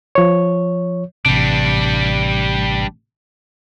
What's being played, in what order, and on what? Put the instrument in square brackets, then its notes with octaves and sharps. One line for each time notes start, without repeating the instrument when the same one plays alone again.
[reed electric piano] F3 C#5
[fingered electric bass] A1 C3 [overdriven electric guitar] G3 D4